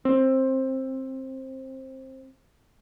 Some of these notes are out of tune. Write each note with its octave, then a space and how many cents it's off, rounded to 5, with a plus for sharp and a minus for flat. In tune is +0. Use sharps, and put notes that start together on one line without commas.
C4 +15